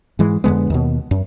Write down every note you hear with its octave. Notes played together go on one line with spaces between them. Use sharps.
G#2 E3 G#3
F2 D3 G#3 B3
D#2 B2
F#2